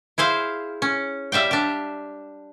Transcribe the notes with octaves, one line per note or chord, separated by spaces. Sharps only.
E4 G#4 C5 F5
C#4
G3 E5 F5 G5
D4 G4